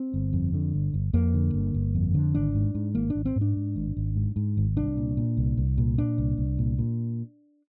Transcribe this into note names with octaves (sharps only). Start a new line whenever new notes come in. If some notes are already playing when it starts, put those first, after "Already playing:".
Already playing: C4
G1
F2
D3
G1
G1
F2 A#3
D3
G1
G1
F2
D3
G#1 D4
G#2
G#2
G#1 A#3
D4
G#1
C4
G#2
D4
G#2
G#1
G#1
G#2
G#2
G#1
C2 D4
A#2
A#2
C2
C2
A#2
A#2 D4
C2
C2
A#2
A#2